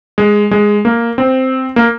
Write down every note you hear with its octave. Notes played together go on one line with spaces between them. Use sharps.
G#3
G#3
A#3
C4
A#3